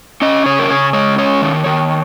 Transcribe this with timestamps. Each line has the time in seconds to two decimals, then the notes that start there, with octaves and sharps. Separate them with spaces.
0.22 C#4 D#5
0.46 C#3 C#5
0.59 A#4
0.70 C#3 C#5
0.93 G#3 C#5
1.18 C#4 C#5
1.42 D#3
1.66 D#3